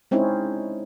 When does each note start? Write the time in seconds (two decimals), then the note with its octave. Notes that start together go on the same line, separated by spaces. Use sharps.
0.11 G#3 C4 C#4 D#4 E4 G#4